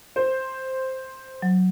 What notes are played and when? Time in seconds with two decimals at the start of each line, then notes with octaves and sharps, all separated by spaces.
0.16 C5
1.42 F#3